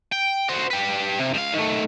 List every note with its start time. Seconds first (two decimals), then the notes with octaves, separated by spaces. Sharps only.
0.12 G5
0.49 F#4 C5
0.70 G4 B4
1.19 C3
1.34 C#2 F5
1.54 D#3 A3